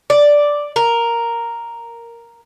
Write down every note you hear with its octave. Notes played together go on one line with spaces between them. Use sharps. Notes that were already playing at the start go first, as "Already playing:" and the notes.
D5
A#4